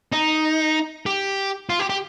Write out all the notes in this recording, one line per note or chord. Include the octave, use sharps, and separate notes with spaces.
D#4
G4
F4
G4
G4